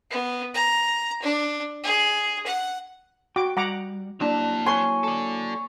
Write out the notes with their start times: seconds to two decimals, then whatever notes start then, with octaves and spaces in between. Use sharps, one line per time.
0.11 B3
0.54 A#5
1.22 D4
1.84 G#4
2.46 F#5
3.36 F#4 G5 D6
3.57 G3 F#5 A#5 D6
4.21 F#3 A#3 C4 D4 E4 A5
4.66 C#5 G#5 C6
5.04 A4 D5